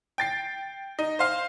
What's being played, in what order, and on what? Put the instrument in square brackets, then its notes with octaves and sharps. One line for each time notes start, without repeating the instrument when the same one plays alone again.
[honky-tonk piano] G5 A6 C7
D#4
C5 F5